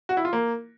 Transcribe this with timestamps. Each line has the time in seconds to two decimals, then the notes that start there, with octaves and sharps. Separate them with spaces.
0.09 F#4
0.17 E4
0.25 F4
0.33 A#3